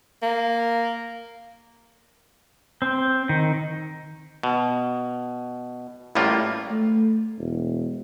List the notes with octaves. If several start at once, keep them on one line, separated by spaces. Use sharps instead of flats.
A#3
C4
D#3
B2
A1 A2 G3 A#3 F4
A3
E1